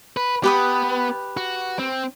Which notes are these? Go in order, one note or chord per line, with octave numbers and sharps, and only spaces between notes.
B4
B3 G4 B4 D#6
F#4
C4